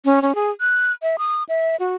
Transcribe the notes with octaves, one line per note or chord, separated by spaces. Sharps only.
C#4
C#4
G#4
F#6
E5
D#6
E5
F#4